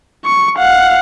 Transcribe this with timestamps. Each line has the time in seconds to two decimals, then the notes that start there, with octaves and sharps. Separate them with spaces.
0.25 C#6
0.57 F5 F#5